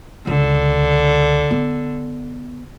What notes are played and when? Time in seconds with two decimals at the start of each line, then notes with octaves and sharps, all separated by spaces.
0.27 C#2 D3
1.51 B3